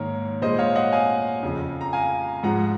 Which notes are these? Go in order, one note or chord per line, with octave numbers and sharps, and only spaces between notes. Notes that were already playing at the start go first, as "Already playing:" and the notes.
Already playing: G#2 D#3 A#3 A#4 C#5
A#2 G#3 C5 D#5
C#5 F5
D#5 F#5
F5 G#5
F2 C#3 F3
A#5
F5 G#5
G#2 F3 G#3 F#5 A#5